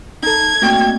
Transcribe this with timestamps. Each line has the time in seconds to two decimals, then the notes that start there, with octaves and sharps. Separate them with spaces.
0.23 D#4 A4 G#6
0.62 A3 A#3 C4 F#4 G5